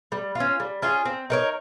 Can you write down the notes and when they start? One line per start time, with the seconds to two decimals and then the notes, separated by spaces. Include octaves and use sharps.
0.12 G3
0.35 F4
0.40 C#4
0.60 G3
0.82 C#4 F4 G#4
1.05 C4
1.30 D#4 A#4 C#5